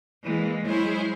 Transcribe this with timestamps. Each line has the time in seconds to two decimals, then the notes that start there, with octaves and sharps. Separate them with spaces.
0.23 E3 G#3 A#3
0.64 F#3 G#3 E4 G#4 C5 C#5